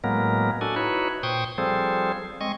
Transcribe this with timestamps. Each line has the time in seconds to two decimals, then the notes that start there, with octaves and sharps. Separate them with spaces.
0.04 A2 F#3 G#3 A#3 B3 A#4
0.61 D4 F#4 A4 G#5
0.76 D#4 E4 F#4 B4 C#5
1.23 A#2 C5 G5 C#6 D#6
1.58 F3 G3 C4 G#4 A4 C5
2.41 G#3 C4 D#5 C#6